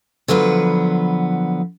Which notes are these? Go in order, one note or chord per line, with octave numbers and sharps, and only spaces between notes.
D3 F3 F#3 B3 B4